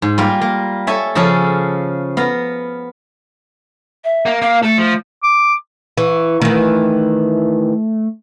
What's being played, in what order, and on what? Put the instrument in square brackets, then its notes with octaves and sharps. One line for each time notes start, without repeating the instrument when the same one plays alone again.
[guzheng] G#2
G3 A#3 F4
A#3
A4 C#5 E5 G#5
C#3 F3 C#4 G#4 A4
B3 F5 A#5
[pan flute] E5
[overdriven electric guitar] A#3
[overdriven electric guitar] A#3 [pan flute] F5
[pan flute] A3 [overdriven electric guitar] A4
[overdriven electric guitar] F3
[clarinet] D6
[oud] E3 [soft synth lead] C#6
[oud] D#3 E3 [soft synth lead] A3